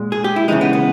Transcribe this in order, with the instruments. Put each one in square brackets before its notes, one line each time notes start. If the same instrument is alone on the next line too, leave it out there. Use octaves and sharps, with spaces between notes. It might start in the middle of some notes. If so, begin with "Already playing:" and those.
Already playing: [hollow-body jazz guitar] A#2 G#3
G#4
G4
E4
C#3 E3 G#3 D#4
B3
B3